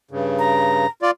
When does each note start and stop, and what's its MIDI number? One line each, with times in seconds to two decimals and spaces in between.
0.11 0.86 43
0.11 0.86 49
0.39 0.87 82
1.02 1.11 65
1.02 1.11 74